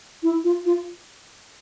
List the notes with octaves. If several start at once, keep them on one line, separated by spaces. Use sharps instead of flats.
E4
F4
F4